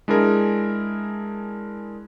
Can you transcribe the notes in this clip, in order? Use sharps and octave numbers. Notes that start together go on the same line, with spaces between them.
G#3 D4 E4 G#4 A#4